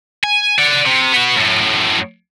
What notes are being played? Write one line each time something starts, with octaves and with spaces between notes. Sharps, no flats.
G#5
D5 F#5
C3
B3 F#4
F#2 A2